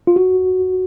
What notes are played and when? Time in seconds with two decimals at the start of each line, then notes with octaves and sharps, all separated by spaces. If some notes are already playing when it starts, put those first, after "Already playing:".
0.07 F4
0.16 F#4